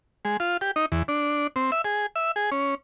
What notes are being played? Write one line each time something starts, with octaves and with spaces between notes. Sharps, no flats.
G#3
F4
G4
D#4
E2
D4
C4
E5
G#4
E5
G#4
C#4